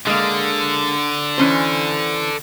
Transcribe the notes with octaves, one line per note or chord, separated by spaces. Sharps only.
D3 G#3 A#3
E3 C#4 C5